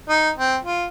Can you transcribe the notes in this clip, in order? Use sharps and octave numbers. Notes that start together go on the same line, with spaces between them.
D#4
C4
F4